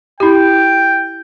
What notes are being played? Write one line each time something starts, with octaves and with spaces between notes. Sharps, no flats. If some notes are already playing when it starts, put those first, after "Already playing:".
E4 G4 G5